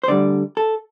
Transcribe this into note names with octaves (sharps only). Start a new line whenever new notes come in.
C5
D2 D3 G3 D5
A4